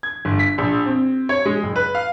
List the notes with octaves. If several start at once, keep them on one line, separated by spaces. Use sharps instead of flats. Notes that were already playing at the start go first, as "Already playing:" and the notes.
G#6
G1
B6
A#1
C4
C#5
G#3
F#1
B4
F5